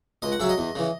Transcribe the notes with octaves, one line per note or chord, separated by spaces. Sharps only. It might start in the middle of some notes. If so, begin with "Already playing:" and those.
C#2 D#5
F#5
C#3 F#3 E5
D#5
E2
C#3 E3